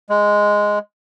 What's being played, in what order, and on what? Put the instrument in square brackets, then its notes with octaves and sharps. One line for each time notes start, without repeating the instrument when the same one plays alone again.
[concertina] G#3